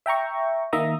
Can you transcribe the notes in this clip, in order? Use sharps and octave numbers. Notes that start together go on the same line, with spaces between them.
E5 G5 A#5 C#6
D#3 A#3 E5 A#5 D#6